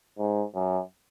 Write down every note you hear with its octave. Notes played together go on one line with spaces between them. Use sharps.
G#2
F#2